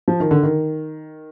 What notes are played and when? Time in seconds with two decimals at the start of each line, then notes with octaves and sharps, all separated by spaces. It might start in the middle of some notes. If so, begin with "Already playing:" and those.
0.08 F3
0.20 D#3
0.31 D3
0.43 D#3